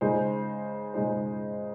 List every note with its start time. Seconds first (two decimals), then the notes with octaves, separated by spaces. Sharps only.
0.01 C#3 G#3 D#4 G#4 C5
0.94 C#3 G#3 D#4 G#4 C5